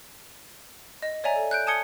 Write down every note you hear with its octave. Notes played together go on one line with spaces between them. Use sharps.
D#5
C#5 D5 E5 G#5 A#5
A4
F#6 G6 D7
G#5 A5 D#6 G#6 C#7 G7